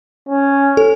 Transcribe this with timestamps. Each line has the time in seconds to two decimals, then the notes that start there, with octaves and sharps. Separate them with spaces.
0.29 C#4
0.77 A4